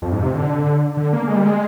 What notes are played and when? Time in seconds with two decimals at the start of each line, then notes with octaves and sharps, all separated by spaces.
0.02 F2
0.12 G#2
0.22 C3
0.34 D3
0.97 D3
1.13 A#3
1.28 G#3
1.36 G3
1.44 G#3